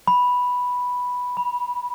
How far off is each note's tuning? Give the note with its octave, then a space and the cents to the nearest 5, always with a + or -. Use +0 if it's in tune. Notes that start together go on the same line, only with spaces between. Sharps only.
B5 -5
B5 -25